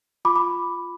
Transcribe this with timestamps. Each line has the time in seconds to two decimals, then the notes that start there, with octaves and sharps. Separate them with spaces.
0.25 F4 B5 D6
0.35 B5 D6